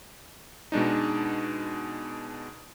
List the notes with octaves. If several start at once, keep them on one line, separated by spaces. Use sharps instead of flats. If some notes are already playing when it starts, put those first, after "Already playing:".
B2 G#3 D4 D#4